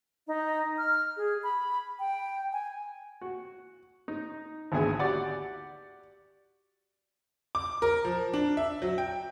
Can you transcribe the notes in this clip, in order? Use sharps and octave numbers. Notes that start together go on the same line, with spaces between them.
D#4
F6
G#4
B5
G5
G#5
F#4
D#4
G#1 D2 B3 G#4 E5 G#5
F#4 G4 D5 F#5
D6
A#4
F3
D4
E5
F#3
G5